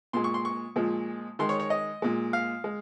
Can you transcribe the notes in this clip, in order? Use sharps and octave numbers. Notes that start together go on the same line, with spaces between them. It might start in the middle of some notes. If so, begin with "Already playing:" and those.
A#2 G#3 C6
C#6
C6
C#6
A#2 F3 G#3
D#3 G#3 C6
C#5
C#5
D#5
A#2 G#3
F5
G#3